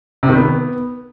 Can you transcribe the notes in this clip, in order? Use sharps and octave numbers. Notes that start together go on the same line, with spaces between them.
C3
D#3
B3